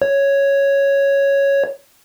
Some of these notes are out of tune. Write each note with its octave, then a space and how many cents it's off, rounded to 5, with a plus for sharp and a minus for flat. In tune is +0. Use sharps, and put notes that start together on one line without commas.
C#5 +0